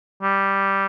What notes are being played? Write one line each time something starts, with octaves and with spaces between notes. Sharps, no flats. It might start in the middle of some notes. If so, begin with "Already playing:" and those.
G3